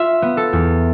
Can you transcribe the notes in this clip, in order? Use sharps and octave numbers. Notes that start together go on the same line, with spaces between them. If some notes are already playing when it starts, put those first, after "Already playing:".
Already playing: F4 E5
B3
A4
E2